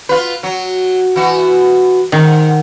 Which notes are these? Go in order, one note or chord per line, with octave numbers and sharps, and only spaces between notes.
F4 B4
F#3
E3 F#4
G#2 D#3